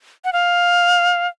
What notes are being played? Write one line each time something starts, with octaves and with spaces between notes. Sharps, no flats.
F#5
F5